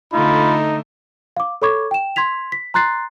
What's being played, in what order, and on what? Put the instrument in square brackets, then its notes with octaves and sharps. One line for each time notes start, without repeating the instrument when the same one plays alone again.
[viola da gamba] D3 A3 [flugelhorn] D#4 [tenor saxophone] F4 [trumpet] B5
[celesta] F5 D6
A4 C#5 B5 C#6 D6 G#6
G5 E7
C6 G#6 B6 F7
B6
A#5 C6 F#6 A6 C7